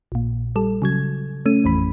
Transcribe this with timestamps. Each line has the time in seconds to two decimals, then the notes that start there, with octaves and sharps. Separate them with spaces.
0.12 A#1 A#2
0.56 G3 A4
0.82 C#3 F#3 G#6
1.46 A3 C#4 D#7
1.64 A1 F2 E3 B5